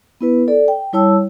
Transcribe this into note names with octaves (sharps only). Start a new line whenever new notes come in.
B3 E4 B4
A4 D5
G5
G3 E4 C#5 A5 E6